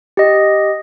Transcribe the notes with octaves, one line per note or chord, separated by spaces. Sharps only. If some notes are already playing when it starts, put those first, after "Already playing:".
G4 D#5